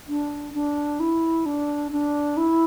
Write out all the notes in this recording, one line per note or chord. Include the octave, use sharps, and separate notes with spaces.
D4
D4
E4
D4
D4
E4